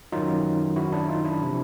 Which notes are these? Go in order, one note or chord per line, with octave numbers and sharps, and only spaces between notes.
F#2 D#3 F#3 D#4 F4
E4 F#4
D4 E4
D#4 F4
D4 E4
C3 F3